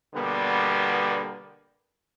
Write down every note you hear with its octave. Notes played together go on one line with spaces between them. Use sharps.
B2 D3 G3 A#3 B3